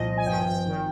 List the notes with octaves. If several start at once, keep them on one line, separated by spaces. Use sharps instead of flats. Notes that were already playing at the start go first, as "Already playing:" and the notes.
Already playing: C2 A#2 F3 D#5
G#5
G#1 G2 F3 G5
G5
G#1 D#3